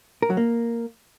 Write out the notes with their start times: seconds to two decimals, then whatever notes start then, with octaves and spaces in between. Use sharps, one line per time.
0.22 A#4
0.30 F#3
0.37 A#3